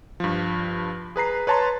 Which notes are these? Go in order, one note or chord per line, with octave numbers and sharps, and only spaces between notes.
G2 F3
G#4 B4 A#5 C7
B4 C#5 A5 A#5 C6